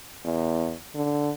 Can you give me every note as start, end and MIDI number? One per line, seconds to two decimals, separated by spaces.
0.25 0.74 40
0.95 1.31 50